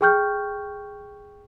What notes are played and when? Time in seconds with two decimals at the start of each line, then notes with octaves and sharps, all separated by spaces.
0.01 G#4 A4 G5 C#6 F6 G6